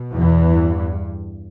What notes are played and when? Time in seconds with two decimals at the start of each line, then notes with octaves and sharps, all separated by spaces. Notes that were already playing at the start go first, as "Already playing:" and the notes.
Already playing: B2
0.16 E2 E3
0.48 G2